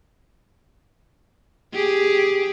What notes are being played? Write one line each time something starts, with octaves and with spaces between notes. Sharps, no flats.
G4 G#4